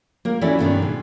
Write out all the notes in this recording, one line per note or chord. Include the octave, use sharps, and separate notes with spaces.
A#3 A#4
E3 C#4 E4 F#4 A4 D5
G2 B2 D#3 B3 D4
G#2